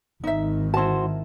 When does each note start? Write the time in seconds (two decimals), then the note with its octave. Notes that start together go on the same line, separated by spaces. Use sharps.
0.24 G#1 D#3 D#4 E5
0.74 E4 F#4 C5 A5